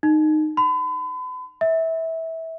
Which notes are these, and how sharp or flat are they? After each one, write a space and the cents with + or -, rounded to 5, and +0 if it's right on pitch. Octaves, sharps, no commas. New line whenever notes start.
D#4 -15
B5 +40
E5 -20